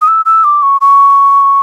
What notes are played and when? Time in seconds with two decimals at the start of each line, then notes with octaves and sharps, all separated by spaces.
0.02 D#6
0.08 E6
0.26 E6
0.44 D6
0.63 C#6
0.81 C#6